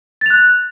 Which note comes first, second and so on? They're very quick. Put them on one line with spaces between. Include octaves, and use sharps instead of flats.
A6 F7 F#6